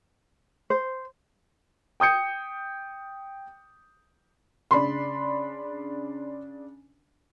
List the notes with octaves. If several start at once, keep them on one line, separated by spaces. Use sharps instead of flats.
C5
G5 D#6 G6 C#7
C#3 D4 B5 C6